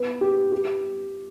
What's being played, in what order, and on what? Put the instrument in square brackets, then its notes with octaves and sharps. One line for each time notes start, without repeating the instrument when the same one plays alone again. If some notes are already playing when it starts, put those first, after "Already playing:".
Already playing: [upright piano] B3 B4
G4
G4